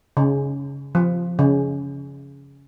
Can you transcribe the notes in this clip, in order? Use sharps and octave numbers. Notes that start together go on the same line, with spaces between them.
C#3
F3
C#3